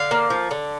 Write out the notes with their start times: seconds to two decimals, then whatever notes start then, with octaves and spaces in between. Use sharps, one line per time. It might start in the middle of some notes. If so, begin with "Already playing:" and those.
Already playing: D3 F5
0.11 A#3
0.30 F3
0.51 D3